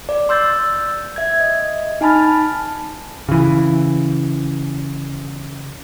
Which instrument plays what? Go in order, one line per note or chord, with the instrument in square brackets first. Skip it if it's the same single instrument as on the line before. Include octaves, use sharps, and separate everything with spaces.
[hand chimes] D5
C6 E6 G6 A6
E5 G#6
D#5
D#4 G#5 A5 B5 F6 A6
[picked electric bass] C#3 E3